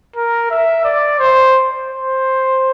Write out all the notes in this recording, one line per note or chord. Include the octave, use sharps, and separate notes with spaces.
A#4
E5
D5
C5
C5